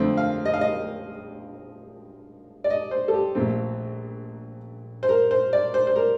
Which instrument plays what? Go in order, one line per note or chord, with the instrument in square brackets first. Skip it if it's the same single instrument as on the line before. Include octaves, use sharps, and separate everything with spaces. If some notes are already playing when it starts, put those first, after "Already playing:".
Already playing: [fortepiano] F2 D3 A3 C4
F5
D#5
F5
D#5
D5
D#5
C5
A4
G4
A#1 A#2 A3 C4
C5
A#4
C5
D5
C5
C5
A#4